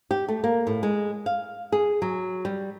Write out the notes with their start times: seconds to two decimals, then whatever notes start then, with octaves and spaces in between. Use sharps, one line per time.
0.11 G4
0.28 A3
0.44 A#3
0.67 A2
0.83 G#3
1.26 F5
1.72 G#4
2.02 F#3
2.45 G3